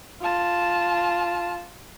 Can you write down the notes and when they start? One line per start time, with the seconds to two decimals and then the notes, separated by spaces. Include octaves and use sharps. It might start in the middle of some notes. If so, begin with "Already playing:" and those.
0.21 F4 A5